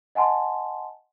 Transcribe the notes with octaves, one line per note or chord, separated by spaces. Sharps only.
D#5 F#5 G#5 A5 C6